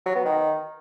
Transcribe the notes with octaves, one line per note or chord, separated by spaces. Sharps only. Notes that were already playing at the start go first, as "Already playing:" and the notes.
F#3
B3
D#3